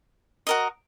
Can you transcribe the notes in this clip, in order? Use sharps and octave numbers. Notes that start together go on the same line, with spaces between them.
F#4 A#4 D#5